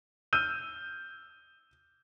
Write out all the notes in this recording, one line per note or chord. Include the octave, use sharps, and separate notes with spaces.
E6 F6 G6 D#7